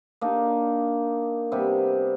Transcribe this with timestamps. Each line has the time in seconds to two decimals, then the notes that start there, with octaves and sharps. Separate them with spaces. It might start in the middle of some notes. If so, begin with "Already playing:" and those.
0.21 A#3 D4 D#4
1.52 C3 G3 B3